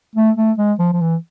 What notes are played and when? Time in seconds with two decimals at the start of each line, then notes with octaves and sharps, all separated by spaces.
0.15 A3
0.37 A3
0.58 G#3
0.79 F3
0.92 F3
1.01 E3